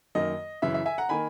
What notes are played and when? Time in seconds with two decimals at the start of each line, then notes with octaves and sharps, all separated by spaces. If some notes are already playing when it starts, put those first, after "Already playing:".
0.15 F#2 D#3 A#3 D#5
0.62 F#2 C#3 E3 E5
0.74 E5
0.86 E5 G#5
0.98 F#5 A#5
1.09 D#3 A#3 G#5 B5